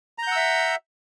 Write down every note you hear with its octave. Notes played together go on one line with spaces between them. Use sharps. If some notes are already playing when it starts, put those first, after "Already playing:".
E5 F#5 A#5 E6 G6